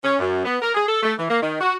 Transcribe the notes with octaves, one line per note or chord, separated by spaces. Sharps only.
C#4
F#2
B3
A#4
G#4
A4
A3
E3
A#3
D#3
F#4